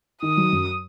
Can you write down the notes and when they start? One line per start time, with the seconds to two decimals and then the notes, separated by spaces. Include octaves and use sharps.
0.22 D#3 D#6
0.37 F#3
0.53 F#2